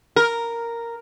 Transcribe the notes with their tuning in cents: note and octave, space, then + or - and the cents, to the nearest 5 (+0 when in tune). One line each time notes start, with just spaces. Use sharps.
A#4 -5